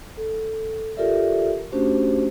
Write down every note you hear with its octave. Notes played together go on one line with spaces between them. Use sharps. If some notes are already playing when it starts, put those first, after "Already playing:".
A4
F4 G4 A4 A#4 D5 E5
A3 C#4 D4 F#4 G4 C5